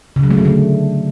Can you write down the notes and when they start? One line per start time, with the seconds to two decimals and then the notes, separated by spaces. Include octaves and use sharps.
0.16 C#3
0.23 F#3
0.31 A3
0.38 D3
0.45 A3